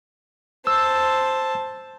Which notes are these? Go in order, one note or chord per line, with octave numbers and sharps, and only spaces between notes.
C5 A5 E6